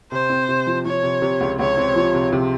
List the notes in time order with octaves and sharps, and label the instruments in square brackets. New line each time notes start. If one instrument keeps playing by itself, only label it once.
[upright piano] C3 [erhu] C5
[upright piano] C4
C3
F3
[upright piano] F3 [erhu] C#5
[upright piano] C3
C3
C#2
[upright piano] C#2 [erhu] C#5
[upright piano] C4
F3
C3
C3